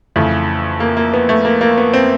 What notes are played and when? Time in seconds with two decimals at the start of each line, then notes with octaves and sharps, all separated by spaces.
0.16 F2 C#3 E3 A3
0.80 A#3
0.97 A#3
1.13 B3
1.29 A3
1.45 A#3
1.61 A#3
1.78 B3
1.94 C4